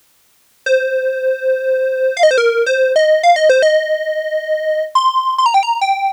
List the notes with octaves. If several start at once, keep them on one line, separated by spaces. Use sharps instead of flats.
C5
F5
D#5
C5
A#4
C5
D#5
F5
D#5
C5
D#5
C6
C6
A#5
G5
A#5
G5